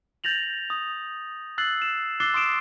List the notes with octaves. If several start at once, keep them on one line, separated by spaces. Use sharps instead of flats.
G6 A6 A#6 F7 F#7
D#6
E6 F#6 A6 C7 F#7
E7
D6 E6 F#6 A6 C7 G7
C6 D#6 D7 E7